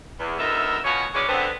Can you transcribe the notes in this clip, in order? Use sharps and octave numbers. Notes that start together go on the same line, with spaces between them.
E2
D2 B3 D#4 A#4 E5
B2 C#4 F4 F#4 C#5
E3 G#3 C#4 F#4 C#5 D5
D3 B3 C4